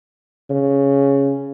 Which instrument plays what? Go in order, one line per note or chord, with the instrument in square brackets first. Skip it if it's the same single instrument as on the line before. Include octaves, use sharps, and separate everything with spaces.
[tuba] C#3